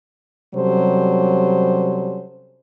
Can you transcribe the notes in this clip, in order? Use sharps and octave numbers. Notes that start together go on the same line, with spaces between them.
C3 F#3 G3 C#4 A4 C5